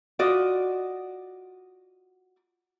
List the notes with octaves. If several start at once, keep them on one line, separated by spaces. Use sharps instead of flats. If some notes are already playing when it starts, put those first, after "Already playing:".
F4 F#4 D5 D#5